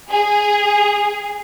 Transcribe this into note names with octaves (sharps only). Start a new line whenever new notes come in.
G#4